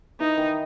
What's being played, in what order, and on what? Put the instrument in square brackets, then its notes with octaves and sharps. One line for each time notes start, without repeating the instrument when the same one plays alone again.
[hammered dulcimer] E3 [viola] D#4
[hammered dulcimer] D#3